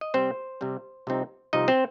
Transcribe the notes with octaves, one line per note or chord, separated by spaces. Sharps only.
D#5
C3 G3 C4 C5
C3 G3 C4
C2 C3 F3 C4 D#4
C2 C3 F3 C4 D#4 D#5
C4 C5